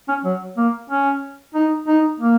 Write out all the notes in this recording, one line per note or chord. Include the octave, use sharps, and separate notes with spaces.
C#4
F#3
A#3
C#4
D#4
D#4
A#3